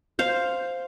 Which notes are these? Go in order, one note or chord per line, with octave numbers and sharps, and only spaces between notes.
C5 F5